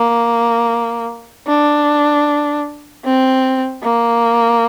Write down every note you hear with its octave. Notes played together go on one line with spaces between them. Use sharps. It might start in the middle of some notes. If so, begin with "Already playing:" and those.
Already playing: A#3
D4
C4
A#3